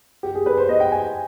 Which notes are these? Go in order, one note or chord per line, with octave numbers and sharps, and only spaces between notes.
G4
G#4
B4
C5
D#5
G5
G#5